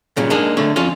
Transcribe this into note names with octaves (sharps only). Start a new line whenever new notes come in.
G2 A#2 C#3
G#3 A#3 D4 D#4
D3 A3 C#5
F2 C#4 F4